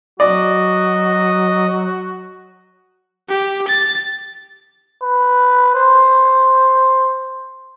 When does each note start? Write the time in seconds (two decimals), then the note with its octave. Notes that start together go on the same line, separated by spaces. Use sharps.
0.20 F#3 F#4 D5 D#5
3.29 G4
3.68 A6
5.02 B4
5.75 C5